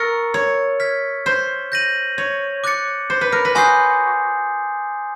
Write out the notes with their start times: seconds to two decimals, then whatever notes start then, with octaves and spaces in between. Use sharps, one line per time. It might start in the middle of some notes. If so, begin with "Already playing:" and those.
Already playing: A#4 C#6 E6 A6 C#7
0.34 C#5
0.80 F6 G#6 B6
1.26 C5
1.72 G6 A#6 D#7 F#7
2.18 C#5
2.64 D6 F#6 A6 C#7
3.10 C5
3.21 B4
3.32 A#4
3.45 B4
3.55 F#4 G#5 C6 D#6 G6 C7